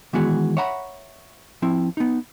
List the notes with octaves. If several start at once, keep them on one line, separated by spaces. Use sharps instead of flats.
D#3 E3 G#3 B3 F#4 G#4
C#5 E5 F#5 A#5 B5
F3 C4 E4
B3 D#4